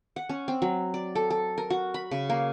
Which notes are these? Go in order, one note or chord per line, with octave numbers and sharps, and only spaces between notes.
F#5
C#4
C4
F#3
D5
A4
A4
A#4
F#4
B5
C#3
A#3